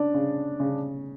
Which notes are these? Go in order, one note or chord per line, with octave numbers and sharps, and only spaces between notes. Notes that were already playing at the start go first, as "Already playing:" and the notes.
Already playing: C#3 D4 D5
C#3
C#3